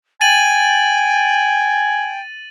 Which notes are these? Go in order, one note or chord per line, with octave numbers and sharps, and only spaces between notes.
G5 G#5 A6 D#7 F#7